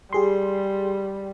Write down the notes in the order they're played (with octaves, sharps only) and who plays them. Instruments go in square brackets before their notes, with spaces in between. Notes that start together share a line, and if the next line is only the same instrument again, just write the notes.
[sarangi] G3 [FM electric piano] G4 G#4 C6